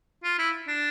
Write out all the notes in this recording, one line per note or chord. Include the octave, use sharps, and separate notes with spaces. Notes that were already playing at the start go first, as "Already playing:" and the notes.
F4
E4
D4